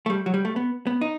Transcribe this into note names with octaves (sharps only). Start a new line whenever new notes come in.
A3
G3
F#3
G3
A3
B3
B3
D#4